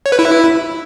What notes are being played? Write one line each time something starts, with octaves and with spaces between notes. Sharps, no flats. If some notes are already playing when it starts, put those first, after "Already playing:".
C#5
B4
E4